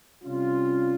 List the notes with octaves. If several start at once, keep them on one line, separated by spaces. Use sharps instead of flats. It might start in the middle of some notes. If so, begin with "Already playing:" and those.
C3 G3 C#4 F4